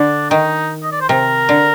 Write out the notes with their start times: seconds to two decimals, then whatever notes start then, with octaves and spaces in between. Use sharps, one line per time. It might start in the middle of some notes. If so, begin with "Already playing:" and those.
Already playing: D3 D4
0.30 D#3 D#4
0.83 D#5
0.92 D5
1.01 C5
1.09 C3 A#4
1.49 D3